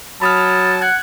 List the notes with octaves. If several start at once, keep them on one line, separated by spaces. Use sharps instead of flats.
F#3 A5 B5 D#6 F6
F#5 F#6 G#6